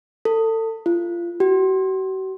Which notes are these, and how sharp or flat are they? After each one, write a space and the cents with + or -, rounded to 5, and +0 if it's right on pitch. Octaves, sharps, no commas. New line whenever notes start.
A4 +30
F4 -25
F#4 +45